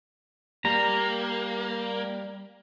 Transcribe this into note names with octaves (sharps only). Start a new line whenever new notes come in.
G3 A#3 A#5